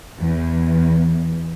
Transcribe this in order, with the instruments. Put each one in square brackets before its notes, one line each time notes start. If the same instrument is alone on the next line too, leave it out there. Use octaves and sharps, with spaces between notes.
[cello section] E2